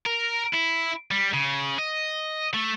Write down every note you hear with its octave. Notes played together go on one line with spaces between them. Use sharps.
A#4
E4
G3
C#3
D#5
A3